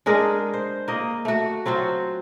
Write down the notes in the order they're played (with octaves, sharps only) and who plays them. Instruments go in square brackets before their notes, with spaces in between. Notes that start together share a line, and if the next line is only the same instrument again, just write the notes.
[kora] G#3 D4 G#4 A#4
C5
A#3 D#5
A3 F#4
F#3 C4 F4 F#4